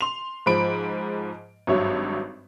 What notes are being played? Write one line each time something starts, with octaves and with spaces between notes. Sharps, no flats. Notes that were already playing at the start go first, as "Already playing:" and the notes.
C6 F7
G#2 F3 B5 D7
G#1 G2 F#3 C#5 E5